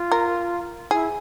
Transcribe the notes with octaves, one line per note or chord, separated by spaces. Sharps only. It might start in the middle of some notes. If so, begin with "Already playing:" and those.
Already playing: F4
A#4
E4 G#4